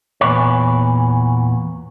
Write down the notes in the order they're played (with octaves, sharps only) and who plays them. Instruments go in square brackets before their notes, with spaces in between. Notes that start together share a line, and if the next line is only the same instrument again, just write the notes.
[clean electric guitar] E2 A#2 B4 C#5